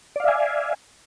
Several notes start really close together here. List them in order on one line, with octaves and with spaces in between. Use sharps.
D5 F5 E5 G#5